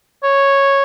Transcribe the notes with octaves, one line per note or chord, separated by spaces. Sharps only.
C#5